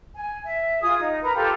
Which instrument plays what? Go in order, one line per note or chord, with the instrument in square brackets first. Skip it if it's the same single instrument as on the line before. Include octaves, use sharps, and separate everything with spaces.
[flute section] G#5
E5
F4 G#4 D#6
D#4
A#4 B4 A#5
F4 G4 A4